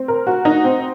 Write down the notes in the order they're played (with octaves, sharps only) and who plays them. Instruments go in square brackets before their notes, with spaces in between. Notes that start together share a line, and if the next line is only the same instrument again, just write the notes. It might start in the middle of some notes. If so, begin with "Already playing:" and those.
Already playing: [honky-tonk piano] C4
A#4
F#4
D#4
C4